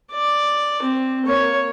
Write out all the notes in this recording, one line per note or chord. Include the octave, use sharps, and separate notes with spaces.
D5
C4
A#3 C#5